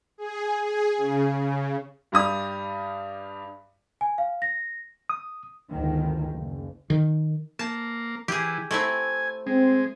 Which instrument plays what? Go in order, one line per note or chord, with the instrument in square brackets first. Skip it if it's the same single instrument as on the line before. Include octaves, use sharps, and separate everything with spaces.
[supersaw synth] G#4
G#4
C#3
C#3
[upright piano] G2 G3 D#6
[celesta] G#5
F5
A#6
[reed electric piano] D#6
[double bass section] G1 D2 G#2 D#3
F#1
[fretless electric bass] D#3
[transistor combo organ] A#3 [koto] A5
[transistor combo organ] E3 [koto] G4 G#4
[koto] A3 C4 E4 [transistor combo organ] G#5
[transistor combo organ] G#3 [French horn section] C4